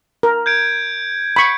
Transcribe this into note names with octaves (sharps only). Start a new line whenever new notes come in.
A#4
G6 G#6 D7
B5 C#6